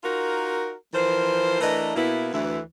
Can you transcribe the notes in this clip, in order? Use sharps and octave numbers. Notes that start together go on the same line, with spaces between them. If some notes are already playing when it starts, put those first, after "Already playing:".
D#4 F4 F#4 A#4
E3 F3 A#4 C5
E3 A3 D4 A#4 B4 D#5
B2 A#3 B3 E4
D2 E3 E4